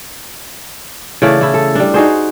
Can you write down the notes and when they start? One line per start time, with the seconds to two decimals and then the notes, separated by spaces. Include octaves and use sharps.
1.22 C#3 E3 A3 D5
1.41 A3 E4
1.54 A4
1.75 G3 D4
1.94 D#4 F#4 G#4 C5